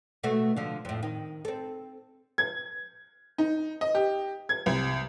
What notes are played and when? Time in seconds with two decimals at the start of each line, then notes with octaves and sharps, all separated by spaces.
0.23 B2 A3 F#4
0.57 D3 F3
0.85 F2 A2
1.03 D#3
1.45 C4 A4
2.38 G#6
3.38 D#4
3.81 D#5
3.95 G4
4.49 G#6
4.66 C2